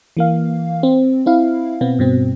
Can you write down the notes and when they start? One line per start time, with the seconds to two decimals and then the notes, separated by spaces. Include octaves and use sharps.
0.17 E3 A#3 F5
0.83 C4
1.26 C4 E4 F5
1.81 B2 B3 C4
1.99 G2 B2 C4